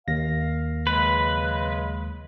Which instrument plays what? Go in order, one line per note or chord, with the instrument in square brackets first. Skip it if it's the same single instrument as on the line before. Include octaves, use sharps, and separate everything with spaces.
[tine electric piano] D#2 A#6 [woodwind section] F5
[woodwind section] C#3 F#3 G#3 [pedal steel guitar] B4